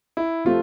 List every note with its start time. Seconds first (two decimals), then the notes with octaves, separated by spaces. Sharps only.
0.17 E4
0.45 C3 F3 A3 F4